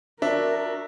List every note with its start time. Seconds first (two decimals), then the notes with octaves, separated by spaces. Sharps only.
0.22 D4 F#4 A#4 E5